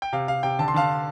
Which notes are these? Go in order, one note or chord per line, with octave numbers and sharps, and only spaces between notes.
G5
C3 F5
C3 F5
C3 G5
D3 A5
C6
D3 F5 A5